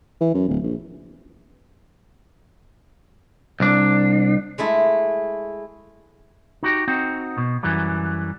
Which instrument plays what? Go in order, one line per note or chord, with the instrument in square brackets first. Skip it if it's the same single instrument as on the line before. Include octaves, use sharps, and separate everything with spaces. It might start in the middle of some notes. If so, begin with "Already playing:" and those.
[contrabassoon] E3
F#2
D1
A#1
[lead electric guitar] C2 D4
[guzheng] G#3 A3 E4 A4
[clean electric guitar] D#4 F#4 G4
C4 D#4 F#4
B2
F#2 E3 F#3 G3